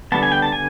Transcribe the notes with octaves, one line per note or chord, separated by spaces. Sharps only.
D3 G3 B3 A5
G#5
G5
A5
G#5